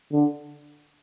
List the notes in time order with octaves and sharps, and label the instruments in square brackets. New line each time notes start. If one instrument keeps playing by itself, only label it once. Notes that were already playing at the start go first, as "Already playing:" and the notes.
[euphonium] D3